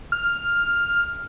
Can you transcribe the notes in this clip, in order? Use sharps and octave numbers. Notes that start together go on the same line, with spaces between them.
F6